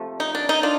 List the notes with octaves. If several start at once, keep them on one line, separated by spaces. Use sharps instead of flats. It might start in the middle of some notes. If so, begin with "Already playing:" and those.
Already playing: C3 F3 A3
D#4
D4
D#4
D4 F4